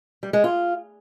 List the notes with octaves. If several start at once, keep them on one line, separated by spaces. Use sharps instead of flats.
G3
G#3
F4